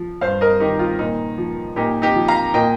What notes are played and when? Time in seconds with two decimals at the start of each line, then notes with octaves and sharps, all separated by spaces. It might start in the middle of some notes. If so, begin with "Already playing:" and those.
Already playing: F3
0.21 G2 C5 F5
0.41 A#4 D#5
0.60 D#3 D#4 G4
0.79 F4
0.99 A#2 D#4
1.38 F3
1.76 A#2 D#4 G4
2.02 D#4 G4
2.15 F3
2.28 F5 A#5
2.54 A#2 D#5 G5